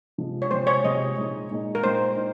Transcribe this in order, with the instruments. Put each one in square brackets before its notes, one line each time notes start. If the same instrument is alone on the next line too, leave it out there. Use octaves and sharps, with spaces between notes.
[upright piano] C3 F3 G#3
[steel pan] C#5
[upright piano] C3 F3 G#3 [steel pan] C5
[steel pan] C#5
[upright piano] C3 F3 G#3 [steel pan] D#5
[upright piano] A#2 G#3 D#4
A#2 G#3 D#4
[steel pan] A#4
[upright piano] A#2 G#3 D#4 [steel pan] C5
[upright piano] D#4